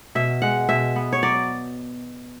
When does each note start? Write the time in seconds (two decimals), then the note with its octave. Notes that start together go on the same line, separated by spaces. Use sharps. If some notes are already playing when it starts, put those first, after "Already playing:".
0.15 B2 E5
0.42 G#3 F#5
0.69 B2 E5
0.96 B3
1.13 C#5
1.23 F#3 D5